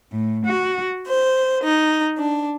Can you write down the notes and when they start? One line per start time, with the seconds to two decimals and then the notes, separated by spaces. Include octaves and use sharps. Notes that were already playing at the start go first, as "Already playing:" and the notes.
0.12 A2
0.46 F#4
1.07 C5
1.62 D#4
2.17 D4